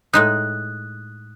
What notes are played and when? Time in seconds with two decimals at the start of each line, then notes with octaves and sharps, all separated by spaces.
0.13 A2 G#3 D#4 D#6 F#6